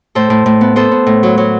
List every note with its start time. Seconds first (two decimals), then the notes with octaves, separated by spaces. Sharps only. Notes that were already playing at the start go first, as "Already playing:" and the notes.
0.15 A2 A4 C5
0.30 A2
0.46 A2
0.61 B3
0.76 B3 A4 C5
0.91 B3
1.07 A2
1.23 F#3
1.38 F#3